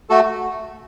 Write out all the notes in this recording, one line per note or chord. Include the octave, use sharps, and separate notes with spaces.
A3 F#4 A4